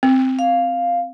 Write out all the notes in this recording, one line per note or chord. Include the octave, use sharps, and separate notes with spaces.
C4
F5